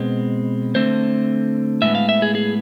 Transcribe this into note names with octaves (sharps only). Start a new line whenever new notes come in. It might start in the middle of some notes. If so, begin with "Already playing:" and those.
Already playing: B2 G#3 C4 B4
D3 A3 C4 C5
A2 G#3 B3 E5
F5
E5
G#4
G#4